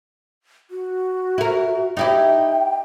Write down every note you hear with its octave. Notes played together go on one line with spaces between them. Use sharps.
F#4
E4 A#4
D#4 E4 G4 G5